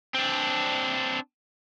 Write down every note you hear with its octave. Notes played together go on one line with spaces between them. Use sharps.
C4 D4